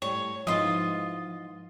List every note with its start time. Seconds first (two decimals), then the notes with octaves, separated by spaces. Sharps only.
0.02 A2 G3 C#5
0.47 G#2 F3 B3 E4 F4 D#5